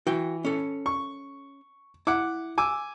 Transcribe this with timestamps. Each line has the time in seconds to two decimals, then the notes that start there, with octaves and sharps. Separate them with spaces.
0.07 E3 F#4 G5
0.45 C#4 A4
0.86 C#6
2.07 E4 F#5 D6
2.58 G#5 D6 E6